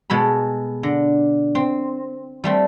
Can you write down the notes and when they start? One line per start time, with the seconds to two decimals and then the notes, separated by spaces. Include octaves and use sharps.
0.10 B2 G#3 A4 B5
0.83 D3
1.55 C4
2.44 G3 A3 C4